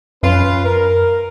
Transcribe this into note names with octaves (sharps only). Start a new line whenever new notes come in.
F#2 C#4 F4 B4
A#4